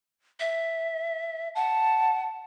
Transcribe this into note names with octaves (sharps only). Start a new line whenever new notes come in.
E5
F#5 A5